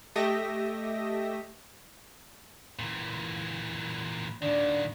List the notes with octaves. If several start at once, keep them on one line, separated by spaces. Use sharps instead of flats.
A3 G4 D#5 E5 A#6
A#2 E3
A#2 D#3 D4